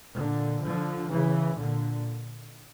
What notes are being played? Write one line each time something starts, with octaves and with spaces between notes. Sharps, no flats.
A#2 D3
D3 F3
C#3 E3
A#2 D3